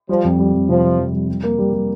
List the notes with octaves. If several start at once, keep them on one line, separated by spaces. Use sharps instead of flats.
F3 G3
F2
G3
F2
C3 F3
G3
F2
G3
G3
A#3
G3
G3